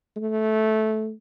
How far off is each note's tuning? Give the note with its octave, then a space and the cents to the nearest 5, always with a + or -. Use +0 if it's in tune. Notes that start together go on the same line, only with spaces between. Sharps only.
A3 -15